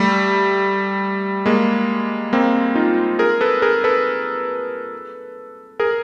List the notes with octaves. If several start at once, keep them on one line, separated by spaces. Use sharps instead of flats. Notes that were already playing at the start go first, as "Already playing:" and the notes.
Already playing: G3 A3
G#3 A#3
A#3 C4
D#4 F4
G#4 A#4
A4 B4
G#4 A#4
A4 B4
G#4 A#4